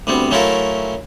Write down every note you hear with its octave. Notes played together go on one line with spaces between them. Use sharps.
D2 G3 B3 C4
F#3 A3 C#4 E4 F4 A#4